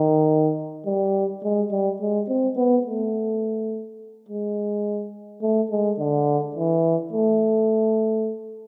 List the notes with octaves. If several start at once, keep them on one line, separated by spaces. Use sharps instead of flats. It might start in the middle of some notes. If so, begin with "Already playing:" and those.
Already playing: D#3
G3
G#3
G3
G#3
C4
B3
A3
G#3
A3
G#3
D3
E3
A3